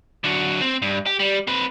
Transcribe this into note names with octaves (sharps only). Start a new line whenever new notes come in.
D3 F#3
C4
G2
G4
G3
C4 B4